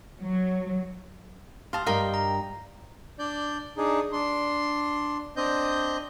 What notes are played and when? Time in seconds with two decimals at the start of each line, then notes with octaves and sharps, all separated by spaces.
0.22 F#3
1.73 G4 F5 A5 C6 D#6
1.87 G2 G4 A#4 D#5 F5 G5
2.14 A#5
3.19 D4 D5 G6
3.77 D4 D#4 G#4
4.12 D4 C6
5.37 C4 D4 D#5 G6